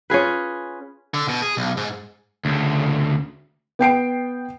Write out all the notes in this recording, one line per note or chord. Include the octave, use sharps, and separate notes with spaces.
C#4 F4 G#4 B4
D3
B2
G#4
B1
G#2
D2 C#3
B3 G5 C7 D7